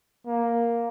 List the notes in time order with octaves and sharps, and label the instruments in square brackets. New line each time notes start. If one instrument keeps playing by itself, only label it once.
[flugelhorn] A#3